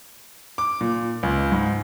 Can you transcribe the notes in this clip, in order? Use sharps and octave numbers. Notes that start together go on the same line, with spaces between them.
D6
A#2
C#2
G#2